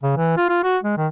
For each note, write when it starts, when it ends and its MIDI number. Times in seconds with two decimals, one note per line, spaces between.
0.03 0.13 49
0.16 0.34 52
0.37 0.45 65
0.49 0.62 65
0.63 0.78 66
0.83 0.97 56
0.97 1.07 51